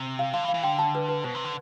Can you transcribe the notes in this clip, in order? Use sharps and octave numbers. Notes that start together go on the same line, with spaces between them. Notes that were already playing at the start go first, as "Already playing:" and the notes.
Already playing: C3
F5
D3 F5
E3
F5
E3
D3 G5
A5
B4
B4
B2 C5
C3
D3